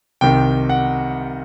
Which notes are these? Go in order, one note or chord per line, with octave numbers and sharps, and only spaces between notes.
C2 C3 D#3 G5
F#5